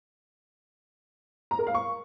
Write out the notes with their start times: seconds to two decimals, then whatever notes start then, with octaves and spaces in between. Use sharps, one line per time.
1.51 A#5
1.59 A#4
1.67 F5
1.74 C#6